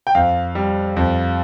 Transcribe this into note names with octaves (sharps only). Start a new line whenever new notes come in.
G5
F2 F5
G3
F2